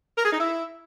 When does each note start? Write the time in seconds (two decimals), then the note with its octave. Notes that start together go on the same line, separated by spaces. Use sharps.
0.18 A#4
0.25 G#4
0.33 D#4
0.40 E4